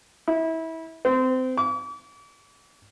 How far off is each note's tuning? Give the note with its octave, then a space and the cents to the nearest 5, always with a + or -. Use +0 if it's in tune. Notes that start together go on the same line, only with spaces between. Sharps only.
E4 -25
C4 -25
D6 -40